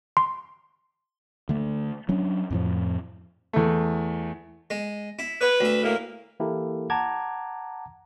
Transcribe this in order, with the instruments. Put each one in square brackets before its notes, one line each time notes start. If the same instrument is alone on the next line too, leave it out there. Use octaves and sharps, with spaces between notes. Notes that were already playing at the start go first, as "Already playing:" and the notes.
[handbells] C6
[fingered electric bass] D3 A3
F#3 C#4 D4
F2 A2 F3
[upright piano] E2 A3
[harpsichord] G#3
E4
[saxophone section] B4 [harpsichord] C#5
[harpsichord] D2 E5
[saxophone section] A2 A#3
[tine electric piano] E3 A#3 E4 G4 A4 A#4
F#5 A5 A#5 D6 G#6